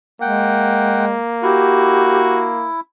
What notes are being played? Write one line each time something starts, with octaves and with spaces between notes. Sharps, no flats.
G#3 A#3 F#5 G5
E4 F#4 G4